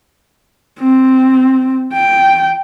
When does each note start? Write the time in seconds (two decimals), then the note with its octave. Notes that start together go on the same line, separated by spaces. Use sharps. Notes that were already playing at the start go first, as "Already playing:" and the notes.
0.80 C4
1.93 G5